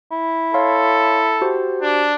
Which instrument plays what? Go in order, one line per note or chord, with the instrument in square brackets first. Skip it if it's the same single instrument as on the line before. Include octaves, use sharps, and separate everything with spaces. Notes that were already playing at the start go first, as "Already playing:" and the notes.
[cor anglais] E4
[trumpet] A4 [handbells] C#5 F5 C6
[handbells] F#4 G4 C5
[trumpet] D4